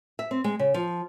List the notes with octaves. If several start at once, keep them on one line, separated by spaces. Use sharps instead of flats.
E5
C4
G#3
C#3
F3